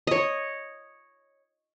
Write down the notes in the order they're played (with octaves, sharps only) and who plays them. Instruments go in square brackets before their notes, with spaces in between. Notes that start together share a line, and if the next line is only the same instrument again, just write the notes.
[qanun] C#5 D#5